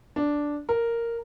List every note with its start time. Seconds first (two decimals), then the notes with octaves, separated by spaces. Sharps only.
0.16 D4
0.69 A#4